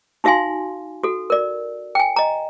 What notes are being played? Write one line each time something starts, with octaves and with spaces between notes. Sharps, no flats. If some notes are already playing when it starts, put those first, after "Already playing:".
D#4 F#4 E5 F5 G#5 C6
F#4 A4
A#4 D5
G5 G#5
D#5 A#5